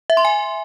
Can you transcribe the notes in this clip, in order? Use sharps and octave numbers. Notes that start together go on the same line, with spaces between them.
E5
C6
G#5